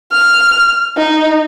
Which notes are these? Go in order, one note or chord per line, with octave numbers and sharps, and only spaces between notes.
F6
D#4